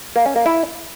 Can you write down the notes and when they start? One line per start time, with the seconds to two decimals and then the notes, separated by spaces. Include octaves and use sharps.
0.16 A#3
0.26 C#4
0.36 A#3
0.46 E4